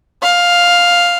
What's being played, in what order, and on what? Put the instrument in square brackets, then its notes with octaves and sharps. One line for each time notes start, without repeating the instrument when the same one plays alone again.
[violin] F5